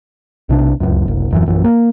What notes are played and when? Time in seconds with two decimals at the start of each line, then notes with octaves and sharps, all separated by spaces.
0.49 B1 C3 D4
0.80 D1 G#1 C#2 F#2
1.08 F#1 C2
1.31 D#1 F#2 E3
1.48 A#1 F#2 E3
1.64 A#3